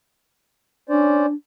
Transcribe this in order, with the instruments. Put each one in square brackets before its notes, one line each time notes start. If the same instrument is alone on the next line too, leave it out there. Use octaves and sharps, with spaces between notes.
[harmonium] C#4 C5 D5 [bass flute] D4